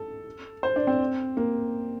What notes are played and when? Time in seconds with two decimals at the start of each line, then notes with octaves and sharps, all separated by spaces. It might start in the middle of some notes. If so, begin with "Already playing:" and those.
Already playing: A4
0.63 C5
0.76 D4
0.87 C4
1.37 A#3